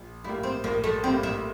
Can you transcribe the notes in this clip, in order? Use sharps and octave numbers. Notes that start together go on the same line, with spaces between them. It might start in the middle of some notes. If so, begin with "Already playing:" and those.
Already playing: A#1
A2 G3 A#3 E4
C4
A#1 A#3
A3
A2 G3 A#3 C4
E4